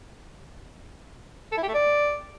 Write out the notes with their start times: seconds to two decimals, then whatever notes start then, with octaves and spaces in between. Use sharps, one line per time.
1.52 A4
1.57 E4
1.63 G4
1.68 A3
1.74 D5